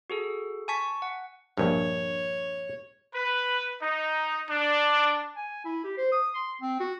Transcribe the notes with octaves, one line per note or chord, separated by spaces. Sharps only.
F#4 G#4 A4
G#5 A5 C#6 B6
F#5
A#1 G2 C#5
B4
D#4
D4
G#5
E4
G4
C5
D#6
C6
C4
F#4